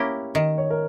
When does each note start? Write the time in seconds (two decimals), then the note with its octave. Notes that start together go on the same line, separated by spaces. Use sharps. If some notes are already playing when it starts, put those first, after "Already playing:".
Already playing: A#3 C#4 E4 G4 C#5
0.35 D#3 D#5
0.58 C#5
0.70 A#4